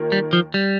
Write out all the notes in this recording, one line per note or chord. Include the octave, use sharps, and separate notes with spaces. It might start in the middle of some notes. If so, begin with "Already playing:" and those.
Already playing: D#2 D#3 A#3 F4 A#4
G3
F3
G3